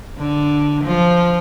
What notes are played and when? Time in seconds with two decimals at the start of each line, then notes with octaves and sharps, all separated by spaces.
0.18 D3
0.84 F3